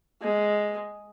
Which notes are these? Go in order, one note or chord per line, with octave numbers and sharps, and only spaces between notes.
G#3